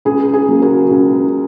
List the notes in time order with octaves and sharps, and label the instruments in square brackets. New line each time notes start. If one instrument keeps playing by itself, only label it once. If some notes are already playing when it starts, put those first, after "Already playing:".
[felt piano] C#2 G#4
G#4
C#3 F#3 A#3
F#4 A#4
C#2